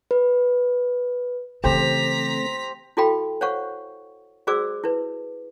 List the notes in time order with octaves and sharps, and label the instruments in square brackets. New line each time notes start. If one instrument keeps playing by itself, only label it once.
[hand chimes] B4
[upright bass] C#3 E3 [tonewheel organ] A3 C4 [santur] G4 C5 [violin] A#5 B6
[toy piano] E4 F#4 A4 F5 G5 B5
C5 C#5 F5 F#5 C#6
F#4 G#4 C5 D5 D6 E6
E4 B4